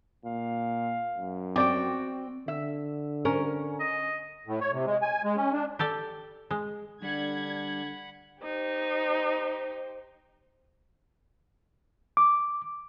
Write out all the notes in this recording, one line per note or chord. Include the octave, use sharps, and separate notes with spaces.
A#2 F5
F#2
C4 F#4 G4 D5 G5
D3 E5
C#4 A#4
D#5
A2
C#5
C3
G#3
G#5
G#3
C#4
D4
G4 A4 D5 G5
G#3
D3 G3 D4 F#5 B5 G#6
D#4 G4 C5
D6